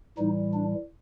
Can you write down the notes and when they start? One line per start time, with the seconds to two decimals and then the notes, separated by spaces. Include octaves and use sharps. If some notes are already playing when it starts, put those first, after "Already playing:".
0.18 A2 E3 G3 D#4
0.53 D4